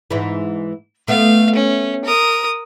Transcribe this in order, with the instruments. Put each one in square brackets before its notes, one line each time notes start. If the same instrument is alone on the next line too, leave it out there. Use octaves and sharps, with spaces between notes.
[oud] G#2 E3
[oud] A3 B3 [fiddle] F5
[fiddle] C#4
A#4 D#6